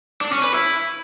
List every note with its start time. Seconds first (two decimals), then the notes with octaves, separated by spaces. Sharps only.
0.21 D4
0.32 C#4
0.43 B4
0.54 E4